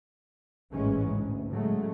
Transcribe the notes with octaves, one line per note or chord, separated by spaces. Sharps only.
A1 G#2 E3 G#3 C#4
D2
A2 C#3 F#3 G#3 A3